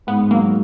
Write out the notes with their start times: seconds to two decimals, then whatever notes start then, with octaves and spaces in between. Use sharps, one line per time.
0.07 G#2 B3
0.31 F#3 A#3